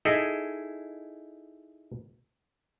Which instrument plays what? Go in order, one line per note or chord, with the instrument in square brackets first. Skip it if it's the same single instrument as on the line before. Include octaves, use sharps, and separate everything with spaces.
[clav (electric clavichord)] D#4 E4 G#4 A4 D#5